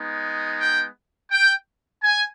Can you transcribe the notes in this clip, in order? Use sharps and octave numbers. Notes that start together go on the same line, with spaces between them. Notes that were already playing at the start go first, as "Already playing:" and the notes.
Already playing: G#3 B3 D#4
G5
G5
G#5